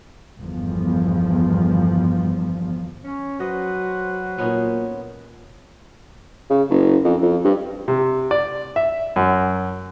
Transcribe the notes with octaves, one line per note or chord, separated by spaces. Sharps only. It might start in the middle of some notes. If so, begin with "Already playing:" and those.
G1 E2 F3
C#4
F#3 F#4 B4 C5 D#5
A#2 B3 C#4 D#4
C#3
F#1
F2
F2
G2
C3
D5
E5
F#2